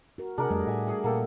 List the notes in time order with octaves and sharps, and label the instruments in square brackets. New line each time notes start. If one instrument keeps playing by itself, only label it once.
[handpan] F#4 A#4
[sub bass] C3 [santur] D4 A#4 F#5 [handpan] G#4
[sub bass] F2 [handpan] G3 A3 D#5
[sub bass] A2 [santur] E5 G#5
[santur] G#4 F#5 G#5
[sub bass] A#2 [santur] A#3 A4 G5